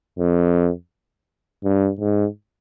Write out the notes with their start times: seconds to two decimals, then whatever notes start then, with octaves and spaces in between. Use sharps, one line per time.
0.19 F2
1.64 G2
2.00 G#2